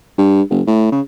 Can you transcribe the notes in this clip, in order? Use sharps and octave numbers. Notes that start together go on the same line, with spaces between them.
G2
F#1
A2
C#3